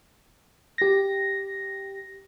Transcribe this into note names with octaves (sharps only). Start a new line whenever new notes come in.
G4 A#6